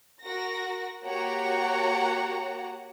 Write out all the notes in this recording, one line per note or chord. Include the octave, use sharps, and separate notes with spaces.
F#4 A#4 A#6
A#3 F#4 G4 C#5 F#5 A#5